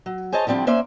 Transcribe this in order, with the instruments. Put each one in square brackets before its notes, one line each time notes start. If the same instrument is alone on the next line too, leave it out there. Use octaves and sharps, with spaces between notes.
[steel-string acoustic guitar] F#3
G#4 C5 C#5 D#5 A5
D3 F3 G3 C4 E4
A#3 C#4 C5 D5 E5